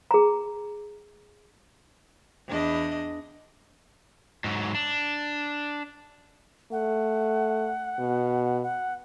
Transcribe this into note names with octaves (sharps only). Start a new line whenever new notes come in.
G#4 A#5
E2 D4 D#5
G#2 F#3
D4
A3 F#5
B2
F#5